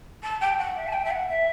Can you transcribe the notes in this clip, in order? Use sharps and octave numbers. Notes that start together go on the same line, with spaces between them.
A5
G5
F#5
E5
A5
G5
E5
F#5
E5